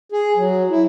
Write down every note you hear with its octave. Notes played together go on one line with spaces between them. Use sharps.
G#4
F#3
E4